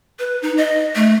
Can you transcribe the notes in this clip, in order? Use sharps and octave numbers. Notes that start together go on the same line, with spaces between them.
B4
D#4
D#5
A3